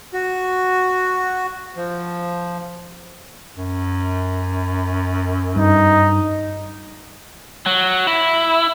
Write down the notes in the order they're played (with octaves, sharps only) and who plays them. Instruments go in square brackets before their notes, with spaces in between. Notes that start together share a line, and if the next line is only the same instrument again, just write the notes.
[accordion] F#4
F3
[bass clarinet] F#2
[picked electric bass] G2 [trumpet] D#4
[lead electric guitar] F#3
E4